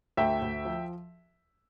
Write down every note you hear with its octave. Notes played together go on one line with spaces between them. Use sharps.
D2 E5 G5
D2
F3